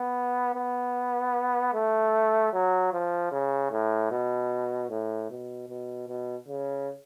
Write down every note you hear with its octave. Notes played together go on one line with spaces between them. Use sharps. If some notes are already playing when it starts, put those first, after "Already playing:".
Already playing: B3
B3
A3
F#3
F3
C#3
A2
B2
A2
B2
B2
B2
C#3